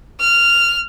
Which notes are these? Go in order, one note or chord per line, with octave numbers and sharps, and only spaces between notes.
F6